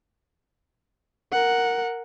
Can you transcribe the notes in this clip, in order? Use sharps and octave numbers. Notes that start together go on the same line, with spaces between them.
A#4 F#5